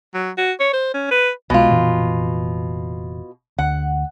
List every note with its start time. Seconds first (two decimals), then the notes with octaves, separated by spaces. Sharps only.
0.14 F#3
0.38 F#4
0.60 C#5
0.73 C5
0.94 C#4
1.11 B4
1.50 B1 B2 G#3 F4
1.70 F1 A#2 E3
3.59 D2 F#5